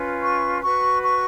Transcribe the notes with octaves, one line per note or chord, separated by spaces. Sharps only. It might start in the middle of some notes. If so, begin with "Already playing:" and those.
Already playing: C#4 F4 B4
C#6
F#4 B4 C#6
C#6